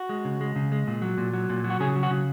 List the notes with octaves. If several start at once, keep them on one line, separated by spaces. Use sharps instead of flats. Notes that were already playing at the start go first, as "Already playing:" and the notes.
Already playing: F#4
G#3
C#3
G#3
C#3
G#3
A#2
F#3
A#2
F#3
A#2
F#3
F#4
C#3 G#4
F#3
F#4
C#3